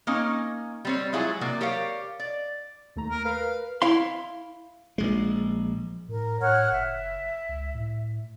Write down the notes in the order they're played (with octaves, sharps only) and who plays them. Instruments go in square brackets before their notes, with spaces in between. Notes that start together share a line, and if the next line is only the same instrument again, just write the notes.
[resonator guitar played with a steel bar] A#3 C#4 D#4
G3 C4 C#5
F#3 G#3 E4 F4 G#4 C#5
C3 F#3 A#3 D5
G4 A#4 C#5 D5 F5
D5
[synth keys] D#2 A3 A#5
[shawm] A#4
[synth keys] A#4 B4 [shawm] F5
[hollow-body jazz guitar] E4 F5 C6
[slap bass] A#1 G#3
[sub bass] A2 [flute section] A#4
[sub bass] A2 [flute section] C#5 F#5 F6
[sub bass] F#1 [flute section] E5
[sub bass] C#2
A2